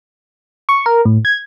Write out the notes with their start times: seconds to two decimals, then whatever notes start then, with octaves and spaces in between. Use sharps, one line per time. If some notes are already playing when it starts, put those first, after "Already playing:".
0.69 C#6
0.86 A#4
1.05 A2
1.25 G#6